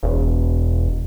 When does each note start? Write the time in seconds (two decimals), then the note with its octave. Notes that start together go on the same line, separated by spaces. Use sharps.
0.03 E1